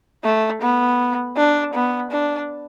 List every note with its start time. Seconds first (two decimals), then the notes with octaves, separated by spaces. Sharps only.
0.24 A3
0.62 B3
1.37 D4
1.74 B3
2.11 D4